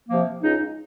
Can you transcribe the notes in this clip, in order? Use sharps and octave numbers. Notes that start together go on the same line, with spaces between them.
C3 F3 A#3
C#2 D#4